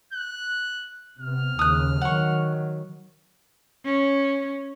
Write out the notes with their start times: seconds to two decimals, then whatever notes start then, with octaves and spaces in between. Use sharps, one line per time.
0.13 F#6
1.20 C3 B3 F6
1.59 D#2 C#3 D#6 F#6
2.01 D#3 F#3 F#5 C#6
3.85 C#4